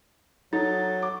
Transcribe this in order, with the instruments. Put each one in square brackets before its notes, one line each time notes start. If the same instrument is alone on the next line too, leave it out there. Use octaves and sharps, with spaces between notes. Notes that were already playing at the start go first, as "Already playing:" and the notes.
[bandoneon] F#3 [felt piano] D#4 [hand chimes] A4 A6
[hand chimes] C#6 [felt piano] D6